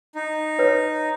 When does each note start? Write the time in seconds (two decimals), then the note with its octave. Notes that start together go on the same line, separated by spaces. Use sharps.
0.15 D#4
0.59 B4 C#5